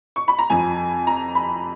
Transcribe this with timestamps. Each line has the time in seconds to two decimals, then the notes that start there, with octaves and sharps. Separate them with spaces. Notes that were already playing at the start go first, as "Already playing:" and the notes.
0.16 C#6
0.28 B5
0.39 A#5
0.50 F2 F3 G#5
1.07 A#5
1.35 B5